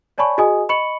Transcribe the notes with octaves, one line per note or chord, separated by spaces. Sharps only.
C#5 D5 G#5 A5 B5 C#6
F#4 G#4 D#5 G#5 D#6
D#5 B5 C#6 C#7 F#7